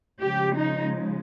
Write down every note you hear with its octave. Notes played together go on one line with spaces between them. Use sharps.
C#3 F3 G#3 G4
D#4